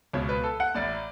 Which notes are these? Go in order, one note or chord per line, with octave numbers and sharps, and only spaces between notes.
C#2 B2 C#5
B4
A4
F#5
A1 A2 D5